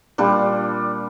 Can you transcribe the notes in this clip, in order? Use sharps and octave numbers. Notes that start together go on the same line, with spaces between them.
A#2 G3 D4 F4